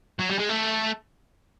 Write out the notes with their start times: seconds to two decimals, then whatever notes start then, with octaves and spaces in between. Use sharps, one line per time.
0.19 F#3
0.30 G3
0.39 G#3
0.49 A3